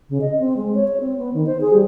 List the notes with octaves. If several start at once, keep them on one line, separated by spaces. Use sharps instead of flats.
C#3
D#5
C4
G#3
C#5
C#5
C4
B3
D#3
C5
G#4
G3